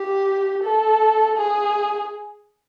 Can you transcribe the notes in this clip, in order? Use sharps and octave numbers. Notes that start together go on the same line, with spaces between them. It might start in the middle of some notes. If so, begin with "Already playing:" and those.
Already playing: G4
A4
G#4